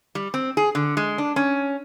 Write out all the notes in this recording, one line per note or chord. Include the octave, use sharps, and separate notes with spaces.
G3
C4
G#4
D3
G#3
D4
C#4